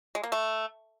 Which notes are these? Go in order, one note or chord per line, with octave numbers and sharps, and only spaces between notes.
G#3
A#3
A3